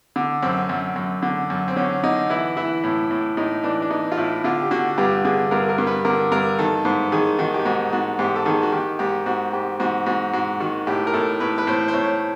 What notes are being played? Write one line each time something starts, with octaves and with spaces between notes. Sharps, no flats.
D3
F#2 C4
F#2
F#2
D3
F#2
C4
D3 C#4
D3 D#4
E3 E4
E3 E4
A2
A2
A2 D#4
E3 D4
D4
E3 D#4
F4
A2 E4
D3 F4
G4
D3 F#4
G2 G4
D3 G#4
G2 A#4
A#4
G2
B4
D3 A#4
G2 A#4
D#3 A4
G#2
D#3 G#4
D#3 F#4
G4
G#2 F#4
G#2 F#4
G#2 G4
A4
D#3 G#4
F#4
D#3 G4
G#2 G4
G#2 F#4
G#2 G4
G#2 F#4
G#2 F#4
G#2 F#4
D#3 F#4
A2 G4
A#4
A2 A4
A2 B4
B4
A2 C5
C5
A2 C#5